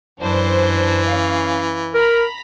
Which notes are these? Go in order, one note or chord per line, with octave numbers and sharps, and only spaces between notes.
F#2 E3 D4 C5
C#4 F5
A#4 A#5 B5